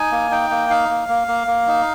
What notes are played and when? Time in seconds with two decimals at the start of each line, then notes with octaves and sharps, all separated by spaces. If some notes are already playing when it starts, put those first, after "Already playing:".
Already playing: D#4 G#5
0.11 A#3
0.31 D#4 G5
0.50 A#3
0.70 D#4 F5
0.89 A#3
1.08 A#3
1.28 A#3
1.47 A#3
1.68 D#4